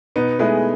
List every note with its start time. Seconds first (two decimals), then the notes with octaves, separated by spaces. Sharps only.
0.16 B2 B3 D#4
0.39 G#3 A3 B3 E4 G#4